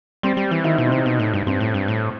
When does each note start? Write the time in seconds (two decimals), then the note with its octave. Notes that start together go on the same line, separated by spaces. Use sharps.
0.23 G3 C4
0.37 G3
0.51 E3
0.64 D#3 E4
0.76 B2 D#4
0.87 C3 C4
0.98 D#4
1.06 B2
1.19 A2
1.34 G2
1.47 G2 C4
1.61 A2
1.74 G2
1.88 A2